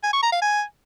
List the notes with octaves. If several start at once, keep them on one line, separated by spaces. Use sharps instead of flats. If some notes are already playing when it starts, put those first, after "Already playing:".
G#5
C#6
A#5
F5
G#5